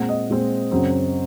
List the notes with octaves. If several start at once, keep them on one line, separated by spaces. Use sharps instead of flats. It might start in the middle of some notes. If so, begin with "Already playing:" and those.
Already playing: A#2 G#3 C4 F#5
D#5
A#2 G#3 C4
F#2 C#3 F#3 C4